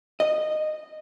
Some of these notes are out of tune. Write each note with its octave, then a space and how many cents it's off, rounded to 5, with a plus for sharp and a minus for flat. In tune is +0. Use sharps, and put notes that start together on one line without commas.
D#5 -15